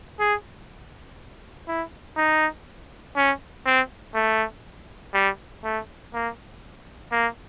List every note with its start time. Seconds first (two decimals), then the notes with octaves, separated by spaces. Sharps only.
0.20 G#4
1.68 E4
2.17 D#4
3.16 C#4
3.66 C4
4.15 A3
5.14 G3
5.64 A3
6.14 A#3
7.12 A#3